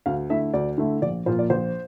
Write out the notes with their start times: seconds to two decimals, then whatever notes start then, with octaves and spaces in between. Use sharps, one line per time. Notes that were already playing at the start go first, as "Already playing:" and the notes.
0.06 D2 F5
0.30 D3 A3 E4 E5
0.53 D2 D5
0.78 D3 A3 E4
1.02 A#1 D5
1.26 A#2 F3 A#3 F4 C5
1.39 D5
1.50 A#1 C5